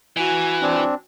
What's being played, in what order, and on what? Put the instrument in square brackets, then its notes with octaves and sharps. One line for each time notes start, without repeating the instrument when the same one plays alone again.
[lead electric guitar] E3 [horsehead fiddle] F#4 G#5
[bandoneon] C4 D4